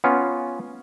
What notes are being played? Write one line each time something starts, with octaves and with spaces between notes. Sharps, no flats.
B3 C#4 F4